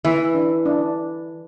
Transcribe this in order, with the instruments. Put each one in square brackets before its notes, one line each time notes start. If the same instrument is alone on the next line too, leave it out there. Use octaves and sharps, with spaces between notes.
[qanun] E3 [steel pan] E5
[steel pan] D4
D4